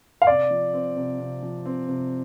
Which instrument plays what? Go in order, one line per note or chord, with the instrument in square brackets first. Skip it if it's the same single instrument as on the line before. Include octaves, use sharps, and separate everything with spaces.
[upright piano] F5
[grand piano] C3 [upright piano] D5
[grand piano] F3
C4
C3
C3
F3
C4
C3